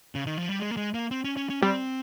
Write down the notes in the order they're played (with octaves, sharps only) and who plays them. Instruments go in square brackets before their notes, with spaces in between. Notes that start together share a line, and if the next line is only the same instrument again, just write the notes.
[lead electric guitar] C#3
D#3
F3
G3
G#3
A#3
G#3
A#3
C4
C#4
C#4
C#4
[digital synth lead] G3 [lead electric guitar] C4